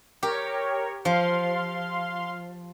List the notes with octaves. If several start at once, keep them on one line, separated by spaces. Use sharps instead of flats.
G4 A#4 C#5
F3 F5 C6